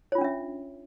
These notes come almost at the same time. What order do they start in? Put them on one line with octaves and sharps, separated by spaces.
C#5 F4 D4 C#4 E5